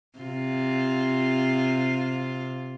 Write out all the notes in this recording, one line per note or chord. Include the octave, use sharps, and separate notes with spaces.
C3 F4